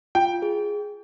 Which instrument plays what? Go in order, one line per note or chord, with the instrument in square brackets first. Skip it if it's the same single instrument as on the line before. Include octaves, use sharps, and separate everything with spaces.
[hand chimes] F4 [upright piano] G5
[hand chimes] G#4